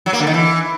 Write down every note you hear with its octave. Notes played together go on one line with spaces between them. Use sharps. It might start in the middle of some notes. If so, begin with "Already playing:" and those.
F#3
A#3
D3
D#3
E3